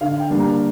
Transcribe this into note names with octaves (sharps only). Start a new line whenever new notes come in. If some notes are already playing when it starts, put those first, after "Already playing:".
D3 F5
G5
G3 A#3 D4
A#5